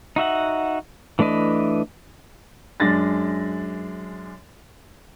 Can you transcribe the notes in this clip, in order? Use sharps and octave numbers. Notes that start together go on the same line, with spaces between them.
D#4 F#4 E5 F#5
E3 A3 D4 B4 D#5
F#2 G#3 D4 A6 A#6